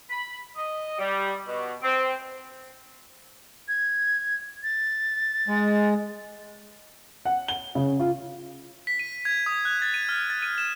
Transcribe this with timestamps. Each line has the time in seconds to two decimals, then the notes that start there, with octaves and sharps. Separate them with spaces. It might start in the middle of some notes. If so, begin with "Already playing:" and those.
0.10 B5
0.56 D#5
0.98 G3
1.46 B2
1.82 C4
3.68 G#6
4.63 A6
5.48 G#3
7.25 F#5
7.48 G7
7.75 C#3
8.00 F4
8.87 B6
8.99 D#7
9.25 G#6
9.46 D#6
9.65 F#6
9.82 A6
9.94 D#7
10.09 F6
10.30 A6
10.42 D#7
10.58 E7